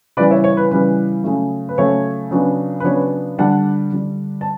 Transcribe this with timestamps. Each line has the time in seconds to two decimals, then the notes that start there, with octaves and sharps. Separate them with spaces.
0.17 C#3 E3 G3 B4 D5
0.31 C#5 E5
0.44 C#5
0.57 B4
0.71 C#3 E3 G3 B4
1.24 C#3 F#3 A3
1.69 B4
1.78 C#3 F#3 A3 C#5
2.31 C#3 F#3 B3 D4
2.80 B4
2.84 C#3 F#3 B3 D4 C#5
3.38 D3 G3 D4 F#5 A5
3.92 D3 G3 D4
4.41 A5